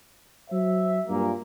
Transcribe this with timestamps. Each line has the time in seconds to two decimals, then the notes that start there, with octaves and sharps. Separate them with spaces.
0.49 F#3 C5 E5
1.08 G2 A#2 A#3